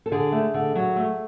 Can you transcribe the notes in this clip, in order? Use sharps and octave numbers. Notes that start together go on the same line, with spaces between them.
A4
D3 G#4
A3
D3
F#3
A3